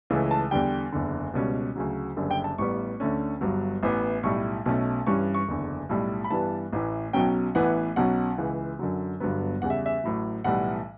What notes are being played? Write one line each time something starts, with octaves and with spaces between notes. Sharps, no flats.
C#2 C#3 E3 A3 C#4
A5
E2 D3 G3 G5
F#1 E2 D3
C#2 B2 G3 C#4
D2 C#3 F#3
F#1 F#2 D3 G3
G5
A5
A1 A2 G3 B3 C#6
D2 D3 A3 C#4
G1 G2 F#3
A1 A2 E3 B3
B1 A2 G3 C#6
B1 B2 A3 C#4
G2 E3 G3 C#4 C#6
C#6
F#1 E2 D3
B1 A2 G3
B5
G2 E3 G3 B3 A5
A1 A2 E3
B1 B2 F#3 C#4 G5
A1 A2 E3 B3 F#5
B1 B2 F#3 C#4 F#5
C#2 C#3 E3
F#2 D3 F#3
G1 G2 D3 F#3 B3
E2 C#3 G3 F#5
E5
E5
A1 A2 F#3
B1 A2 E3 G3 F#5